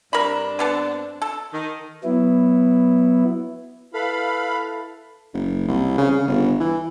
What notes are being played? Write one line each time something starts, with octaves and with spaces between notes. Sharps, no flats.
G2 C4 D4 A#4 B5
D3 B3 A4
A4
D#3
F#3 B3 E4
E4 A4 B4 F5 B5
F#1
C2
C#3
C#3
G1
E3